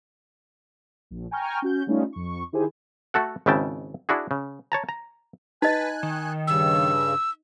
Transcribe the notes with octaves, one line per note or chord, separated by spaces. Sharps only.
A#1
G5 G#5 A#5 C#6 F6 G6
C#4 F#4 G6
G3 A3 C#4 D#4 F4
F2 C#6
D#3 E4 G4 G#4 C5 G#5
A3 F#4 A4 F#5
G#1 G#2 C#3 E4 G5 A5
D4 E4 F#4 G#4
C#3
C#5 A5 A#5
A#5
D#4 B4 D#5 G#5 F#6
D#3
G2 C#3 E6